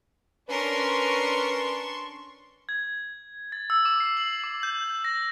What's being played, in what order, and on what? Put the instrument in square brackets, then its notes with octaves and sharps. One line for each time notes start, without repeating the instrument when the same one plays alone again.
[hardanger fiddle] C#4 A#4 [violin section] D4 C6 C#6 [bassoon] B4
[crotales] G#6
A6
E6
D6
C7
F#7
D6
G6
A#6